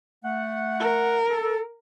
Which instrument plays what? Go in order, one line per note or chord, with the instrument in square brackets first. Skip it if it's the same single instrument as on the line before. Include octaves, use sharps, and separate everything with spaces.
[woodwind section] A3 F#5
[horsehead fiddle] A#4
[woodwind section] A4